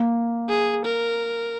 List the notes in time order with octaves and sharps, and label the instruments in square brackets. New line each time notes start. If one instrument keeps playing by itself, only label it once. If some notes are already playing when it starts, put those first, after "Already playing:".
Already playing: [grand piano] A#3
[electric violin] G#4
A#4